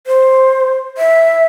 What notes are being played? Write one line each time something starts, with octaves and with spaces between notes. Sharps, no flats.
C5
E5